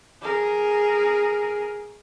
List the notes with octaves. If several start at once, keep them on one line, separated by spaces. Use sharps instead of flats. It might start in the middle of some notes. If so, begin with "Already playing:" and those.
G#4 A#4